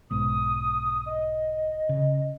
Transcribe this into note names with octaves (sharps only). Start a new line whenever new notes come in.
B1 G#2 D#6
D#5
C#3